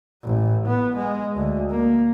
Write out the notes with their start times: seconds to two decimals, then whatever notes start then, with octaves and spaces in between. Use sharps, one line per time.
0.24 A1
0.66 B3
0.96 G#3
1.36 D2
1.71 A#3